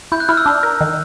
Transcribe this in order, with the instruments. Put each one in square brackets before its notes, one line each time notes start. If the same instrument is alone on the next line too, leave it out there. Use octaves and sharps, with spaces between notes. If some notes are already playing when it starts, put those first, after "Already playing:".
[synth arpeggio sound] E4 [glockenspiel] G6
[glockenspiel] F#6
[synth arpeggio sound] E4 [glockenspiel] F6
[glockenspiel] E6
[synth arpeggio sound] D4
A#4
D#3